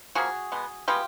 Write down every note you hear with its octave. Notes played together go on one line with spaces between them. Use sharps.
C#3 F3 A#3 F#4 G#4
B2 G#3 B3
B2 G#3 B3 F4 G4